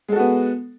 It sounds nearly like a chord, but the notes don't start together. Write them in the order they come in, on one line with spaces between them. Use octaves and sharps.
G#3 A4 F#4 B3